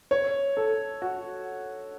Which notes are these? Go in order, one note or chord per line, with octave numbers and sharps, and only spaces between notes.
C#5
A4
F#4